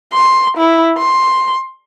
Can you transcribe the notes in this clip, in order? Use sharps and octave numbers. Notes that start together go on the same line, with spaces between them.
C6
E4
C6